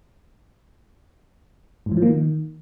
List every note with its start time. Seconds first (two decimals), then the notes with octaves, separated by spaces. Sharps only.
1.86 G#2
1.92 E3
1.97 F3
2.02 A#3
2.08 D#3